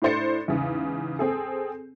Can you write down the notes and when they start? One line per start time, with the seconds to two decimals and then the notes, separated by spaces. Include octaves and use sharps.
0.02 A2 A3 D4 C5 A6 C#7
0.48 E2 G#2 C#3
1.19 C4 G#4 A4